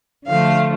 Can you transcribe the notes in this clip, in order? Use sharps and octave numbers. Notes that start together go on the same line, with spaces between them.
D3 F3 A3 F5